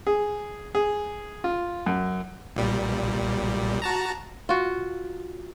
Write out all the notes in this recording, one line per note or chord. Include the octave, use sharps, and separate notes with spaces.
G#4
G#4
F4
F#2
B1 A#2 G3
F#4 A5 A#5
F4 F#4